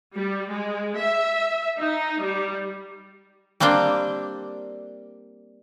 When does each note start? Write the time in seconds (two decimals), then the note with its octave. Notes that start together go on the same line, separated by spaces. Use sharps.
0.14 G3
0.49 G#3
0.96 E5
1.79 D#4
2.22 G3
3.60 G3 A#3 C4 D4 G5